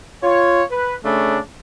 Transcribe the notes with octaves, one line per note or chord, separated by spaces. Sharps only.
F4 C#5
B4
C#3 A3 D4